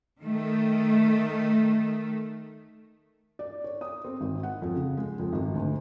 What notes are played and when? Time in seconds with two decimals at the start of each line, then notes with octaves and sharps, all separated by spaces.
0.20 D#3 A3
3.39 D5
3.64 C#5
3.81 D#6
4.05 C4
4.21 G#1
4.43 F#5
4.62 F2
4.76 C#3
4.97 G#3
5.19 F2
5.33 G#1
5.54 D2